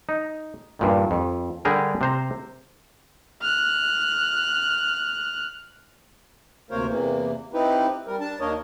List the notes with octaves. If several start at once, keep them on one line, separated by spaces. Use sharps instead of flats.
D#4
G2 A#2 D#3
F2
D3 G3 D4 G4 G#4 A#4
C3 C5 A#5
F6 F#6
D2 C3 A#3 A#4 C5 C#5
E2 C3 E3 A#3
C4 D#4 E4 G4 B4
G3 A#4
D4 A5
D#2 A#3 D4 A#4 C#5 D#5